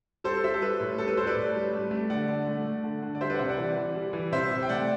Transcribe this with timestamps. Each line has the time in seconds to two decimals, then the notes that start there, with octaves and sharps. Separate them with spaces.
0.24 G3 A4 C5
0.44 G3 C5 E5
0.54 A4
0.62 G3 B4
0.80 A2
0.98 G3 A4
1.08 B4
1.17 G3 A4 C5
1.27 B4 D5
1.36 A2
1.55 G3
1.73 A3
1.91 A3
2.10 D3 D5 F#5
2.29 D3
2.47 A3
2.65 A3
2.84 D3
3.02 D3
3.15 D5
3.21 G3 C5 E5
3.30 B4 D5 F#5
3.39 C3 C5 E5
3.49 D5 F#5
3.58 E3
3.76 E3
3.95 G3
4.13 E3
4.32 C3 C5 E5
4.51 C3
4.63 G5
4.69 A3 D5 F#5